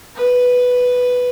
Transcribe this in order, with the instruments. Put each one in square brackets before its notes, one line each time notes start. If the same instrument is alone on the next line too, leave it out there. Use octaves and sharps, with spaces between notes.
[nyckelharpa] B4